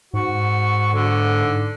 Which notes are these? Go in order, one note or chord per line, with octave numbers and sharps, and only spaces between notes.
G#2 F#4
D3